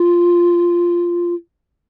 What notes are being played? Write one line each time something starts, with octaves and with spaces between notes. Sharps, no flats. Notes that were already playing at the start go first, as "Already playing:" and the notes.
Already playing: F4